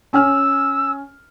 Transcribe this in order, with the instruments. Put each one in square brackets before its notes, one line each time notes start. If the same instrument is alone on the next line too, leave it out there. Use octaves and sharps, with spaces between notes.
[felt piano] C#4 G#5 F6 [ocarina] E6